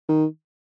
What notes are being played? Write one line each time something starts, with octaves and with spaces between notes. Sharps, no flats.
D#3